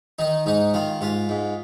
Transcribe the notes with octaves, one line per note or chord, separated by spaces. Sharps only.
D#3 D#4
G#2 D#4
D#3 F4
G#2 F4
G#2